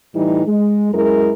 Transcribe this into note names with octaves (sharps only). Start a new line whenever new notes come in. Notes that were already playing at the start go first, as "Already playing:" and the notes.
A2 E3 G3 D#4
G#3
F#2 G#3 E4 A#4